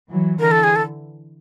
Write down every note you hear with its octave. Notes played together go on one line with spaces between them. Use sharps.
E3 F#3
D3 E3 A#4
A4
G#4
A4